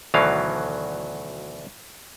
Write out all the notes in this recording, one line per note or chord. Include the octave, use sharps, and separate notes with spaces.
D2 B2 D#3 E3 F#3 F5